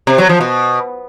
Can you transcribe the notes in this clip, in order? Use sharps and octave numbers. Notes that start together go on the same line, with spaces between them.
C3
F#3
F3
B2